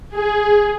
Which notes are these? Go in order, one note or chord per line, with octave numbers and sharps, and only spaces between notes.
G#4